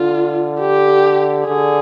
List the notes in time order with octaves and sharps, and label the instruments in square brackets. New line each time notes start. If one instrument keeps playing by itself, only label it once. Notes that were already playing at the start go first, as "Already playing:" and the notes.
Already playing: [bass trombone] D3 [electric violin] F4
[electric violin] G4
[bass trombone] D3 [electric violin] G#4